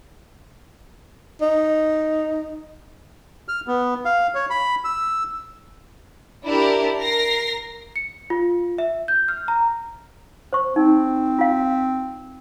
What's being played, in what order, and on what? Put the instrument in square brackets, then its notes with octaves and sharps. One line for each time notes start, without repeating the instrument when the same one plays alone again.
[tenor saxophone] D#4
[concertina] F6
B3
F5
C#5
B5
E6
[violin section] D4 E4 G4 A#4
A#4 A#6 C7
[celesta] C#7
F4
E5
G6
F6
A#5
[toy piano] C5 C#6
[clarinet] C4 [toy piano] D#4
[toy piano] F4 F5